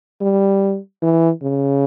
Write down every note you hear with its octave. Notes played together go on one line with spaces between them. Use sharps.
G3
E3
C#3